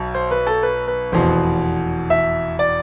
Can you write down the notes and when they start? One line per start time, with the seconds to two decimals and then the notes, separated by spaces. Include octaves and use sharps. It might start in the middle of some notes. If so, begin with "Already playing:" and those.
Already playing: B1 B2
0.15 C5
0.31 B4
0.47 A4
0.63 B4
0.88 B4
1.12 F1 E2 B2 C5
2.10 E5
2.59 D5